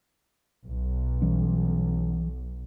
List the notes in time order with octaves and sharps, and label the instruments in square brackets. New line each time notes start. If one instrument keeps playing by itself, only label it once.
[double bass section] B1
[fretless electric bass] E3 G3 C#4